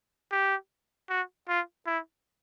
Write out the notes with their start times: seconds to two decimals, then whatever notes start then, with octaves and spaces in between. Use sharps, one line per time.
0.32 G4
1.09 F#4
1.48 F4
1.86 E4